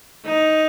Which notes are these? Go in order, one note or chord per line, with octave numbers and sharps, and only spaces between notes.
D#4